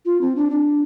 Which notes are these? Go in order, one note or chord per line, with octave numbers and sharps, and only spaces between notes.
F4
C4
D4
D4